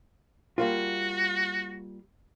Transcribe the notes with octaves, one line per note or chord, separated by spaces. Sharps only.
G3 A#3 F4 F#4